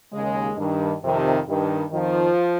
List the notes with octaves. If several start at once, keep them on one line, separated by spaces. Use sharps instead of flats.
D#2 C#3 G#3
G2 D#3
F2 C3 D#3
G2 D#3
F2 D#3 F3